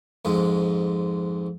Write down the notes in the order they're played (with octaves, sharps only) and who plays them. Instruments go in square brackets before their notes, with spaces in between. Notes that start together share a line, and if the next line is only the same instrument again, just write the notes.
[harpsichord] F2 G#2 G#3